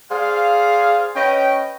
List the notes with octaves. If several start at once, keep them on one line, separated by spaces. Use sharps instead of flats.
G#4 C5 D5 F5
C#4 B4 D#5 G5